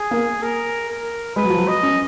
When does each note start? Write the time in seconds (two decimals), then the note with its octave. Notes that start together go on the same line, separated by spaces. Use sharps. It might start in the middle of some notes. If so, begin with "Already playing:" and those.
Already playing: G#4
0.11 A#3
0.43 A#4
0.89 A#4
1.36 G#3 B4
1.44 F#3
1.50 F3
1.58 F#3
1.68 D#5
1.83 C#4